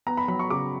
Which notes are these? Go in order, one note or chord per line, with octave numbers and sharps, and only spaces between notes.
B3 A#5
B5
F#3 B5
C#6
C#3 D6